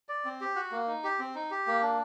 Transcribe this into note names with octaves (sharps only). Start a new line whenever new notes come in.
D5
C4
G4
F#4
A#3
D#4
G4
C4
D#4
G4
A#3
D4